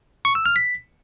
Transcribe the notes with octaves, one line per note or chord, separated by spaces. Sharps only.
C#6
E6
F6
B6